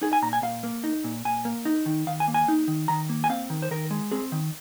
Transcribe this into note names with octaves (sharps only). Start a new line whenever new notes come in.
D#4 G#4
G#5
A#2 A#5
G#5
A#2 F5
A#3
D#4
A#2
A#2 G#5
A#3
D#4
D#3
D#3 F5
G#5
A#3
G#5
D#4
D#3
D#3 A#5
A#3
G#5
C4 F5
D#3
C5
D#3 A#4
G#3
C4 G#4
D#3